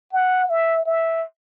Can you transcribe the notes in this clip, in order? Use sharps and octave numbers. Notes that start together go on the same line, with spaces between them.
F#5
E5
E5